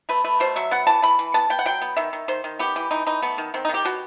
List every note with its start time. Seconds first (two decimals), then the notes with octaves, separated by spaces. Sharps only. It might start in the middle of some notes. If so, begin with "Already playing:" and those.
0.09 A3 B4
0.24 A3 B4
0.40 B2 C5
0.56 F#3 E5
0.71 B3 F#5
0.87 E3 A5
1.03 E3 B5
1.19 E3
1.34 B3 A5
1.50 B3 G5
1.59 F#5
1.66 F#3 G5
1.81 B3
1.97 D#3 E5
2.13 D#3
2.28 D#3 C5
2.44 D#3
2.59 B3 G4
2.76 E3
2.91 E3 D#4
3.06 E3 D#4
3.22 A3 B3
3.38 D#3
3.54 D#3 C4
3.65 D#4
3.69 D#3
3.74 G4
3.85 B2 F#4